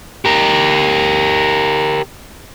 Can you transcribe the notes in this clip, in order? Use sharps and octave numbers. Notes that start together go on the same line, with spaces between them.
G4 A#4